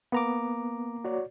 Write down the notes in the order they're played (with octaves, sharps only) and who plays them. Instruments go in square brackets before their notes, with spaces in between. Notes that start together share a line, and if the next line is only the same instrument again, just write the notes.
[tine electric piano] A#3 A#5 D6 [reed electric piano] B3
[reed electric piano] F#4 C#5 D5